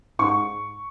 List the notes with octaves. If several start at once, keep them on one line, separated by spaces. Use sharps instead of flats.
G#2 C#6